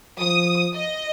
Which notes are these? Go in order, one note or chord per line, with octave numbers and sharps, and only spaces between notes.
F3 D#6
D#5